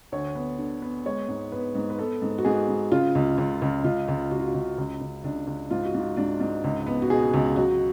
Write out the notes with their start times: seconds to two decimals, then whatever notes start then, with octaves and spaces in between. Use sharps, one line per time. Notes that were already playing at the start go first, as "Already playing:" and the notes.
0.12 D2 C#5
0.35 B3
0.59 D3
0.82 B3
1.05 G#3 C#5
1.28 G#2
1.52 B3 B4
1.75 G#2
1.90 B4
1.99 B3 A4
2.22 G#2
2.38 F#4
2.45 G#2 G#4
2.68 G#2
2.92 C#3 F4
3.15 C#2
3.38 C#2
3.62 C#2
3.84 C#2 F4
4.08 C#2
4.31 C#2 F#4
4.40 F4
4.48 F#4
4.54 C#2
4.78 C#2
5.01 C#2
5.24 C#2 D4
5.47 C#2
5.71 G#2 F4
5.85 F#4
5.94 G#2 F4
6.17 G#2 D4
6.40 G#2
6.64 C#2
6.87 B3
7.02 F#4
7.10 B2 G#4
7.34 C#2
7.56 F#3 F#4